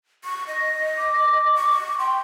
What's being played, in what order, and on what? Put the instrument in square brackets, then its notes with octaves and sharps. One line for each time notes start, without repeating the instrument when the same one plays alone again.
[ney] C#6
D#5
[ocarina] D6
[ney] C#6
[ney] G5 [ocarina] C6